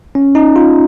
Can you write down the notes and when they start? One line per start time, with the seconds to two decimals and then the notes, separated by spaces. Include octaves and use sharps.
0.15 C#4
0.35 D#4
0.56 F4